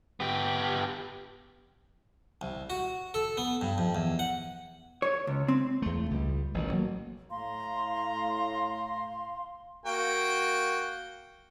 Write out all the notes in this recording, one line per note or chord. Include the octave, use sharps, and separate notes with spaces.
B3 G4
C2
F#4
A4
B3
G2
F2
E2
F#5
C#5
C#2
C4
E2 A3
C#2 G3
A1 B2 D#3
F#3 A#3
A2 F5 A#5 C6
A#3 F#4 G5